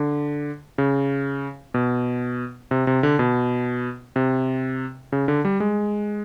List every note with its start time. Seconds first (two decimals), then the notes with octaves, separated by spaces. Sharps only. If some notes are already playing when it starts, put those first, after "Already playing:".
Already playing: D3
0.78 C#3
1.74 B2
2.71 C3
2.87 C3
3.03 D3
3.19 B2
4.16 C3
5.12 C#3
5.28 D3
5.45 G3
5.60 G#3